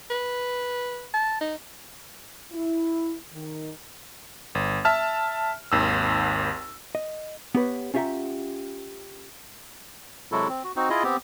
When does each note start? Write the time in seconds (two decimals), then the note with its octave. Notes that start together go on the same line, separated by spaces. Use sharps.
0.10 B4
1.14 A5
1.41 D#4
2.52 E4
3.32 D#3
4.55 G1
4.85 E5 A5 F6
5.72 G#1 D#2 E6
6.95 D#5
7.55 B3 G4 B4 C#5
7.94 C#4 F4 G4 E5 F#5 A#5
10.32 C3 F#3 G#3 E4 F#4 A4
10.49 C4
10.64 F#4
10.76 C4 D#4 F#4
10.90 E4 F4 G#4 D#5
11.04 B3 C4 G4